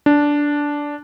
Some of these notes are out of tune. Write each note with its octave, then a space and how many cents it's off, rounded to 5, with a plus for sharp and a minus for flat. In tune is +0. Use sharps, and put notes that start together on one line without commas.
D4 -10